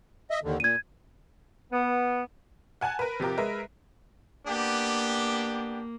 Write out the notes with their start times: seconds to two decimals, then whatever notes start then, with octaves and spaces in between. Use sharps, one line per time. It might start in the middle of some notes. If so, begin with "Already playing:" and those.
0.30 D#5 E5
0.44 D#2 D3 D#3
0.60 A#2 G#6 D#7
1.73 B3
2.81 F#5 G#5 A5 F#6
2.99 A#4 B4
3.20 C3 F3 G4 A#4
3.38 G#3 A#4 B4 E5
4.47 A#3 B3 D4 G4